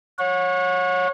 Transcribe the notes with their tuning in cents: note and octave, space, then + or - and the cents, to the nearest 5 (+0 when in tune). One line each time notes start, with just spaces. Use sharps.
C#5 -15 F#5 -35